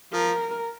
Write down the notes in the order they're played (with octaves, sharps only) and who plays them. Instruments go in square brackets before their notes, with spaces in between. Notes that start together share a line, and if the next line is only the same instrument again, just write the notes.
[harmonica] F3 [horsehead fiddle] A#4